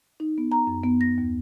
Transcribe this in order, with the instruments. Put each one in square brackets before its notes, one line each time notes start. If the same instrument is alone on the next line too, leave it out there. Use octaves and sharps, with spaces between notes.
[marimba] D#4
B3
A#5
F#2
B3
A#6
D#2